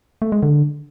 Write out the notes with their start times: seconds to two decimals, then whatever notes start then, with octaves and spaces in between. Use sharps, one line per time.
0.22 A3
0.32 G#3
0.43 D3